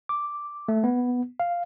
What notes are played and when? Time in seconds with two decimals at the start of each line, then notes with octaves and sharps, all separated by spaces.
0.09 D6
0.68 A3
0.84 B3
1.40 F5